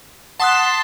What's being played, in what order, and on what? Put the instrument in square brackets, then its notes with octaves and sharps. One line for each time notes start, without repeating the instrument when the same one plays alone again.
[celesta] F#5 D#6 F#6 [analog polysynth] A5 C6 B6